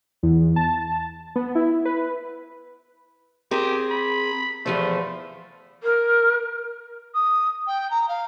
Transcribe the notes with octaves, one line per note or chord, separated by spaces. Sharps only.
E2
A5
B3
E4
B4
C4 G4 G#4 A#4
B5
E2 F3 A3 C5
A#4
D#6
G5
A#5
F5